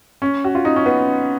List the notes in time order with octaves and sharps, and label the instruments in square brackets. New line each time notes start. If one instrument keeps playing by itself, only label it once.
[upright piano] C#4
F#4
F4
D#4
C#4
B3